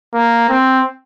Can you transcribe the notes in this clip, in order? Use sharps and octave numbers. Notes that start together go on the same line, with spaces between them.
A#3
C4